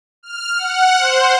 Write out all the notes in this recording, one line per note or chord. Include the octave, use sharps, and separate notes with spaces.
F6
F#5
C5